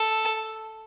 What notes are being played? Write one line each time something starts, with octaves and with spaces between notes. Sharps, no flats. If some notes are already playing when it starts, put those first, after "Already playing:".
Already playing: A4